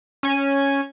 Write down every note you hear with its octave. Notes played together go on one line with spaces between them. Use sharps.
C#4 G#5